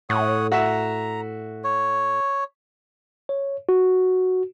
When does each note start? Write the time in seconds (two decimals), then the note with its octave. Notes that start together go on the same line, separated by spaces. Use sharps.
0.10 A2 C#5 F#5 D#6
0.52 F#4 E5 A#5
1.64 C#5
3.29 C#5
3.69 F#4